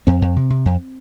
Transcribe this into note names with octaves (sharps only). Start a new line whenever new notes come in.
F2 C4
F2
C3
C3
F2